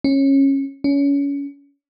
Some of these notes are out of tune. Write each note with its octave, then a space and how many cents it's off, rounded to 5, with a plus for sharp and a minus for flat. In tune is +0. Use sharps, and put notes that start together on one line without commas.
C#4 -20
C#4 +25